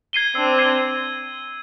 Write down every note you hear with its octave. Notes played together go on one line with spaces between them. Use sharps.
G#6 C7 D#7 G7
C4 D4 E6
G#6 C7 D#7 G7